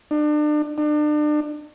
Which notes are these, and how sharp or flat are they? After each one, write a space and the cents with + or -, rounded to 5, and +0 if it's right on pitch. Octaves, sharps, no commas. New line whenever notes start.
D4 +35
D4 +35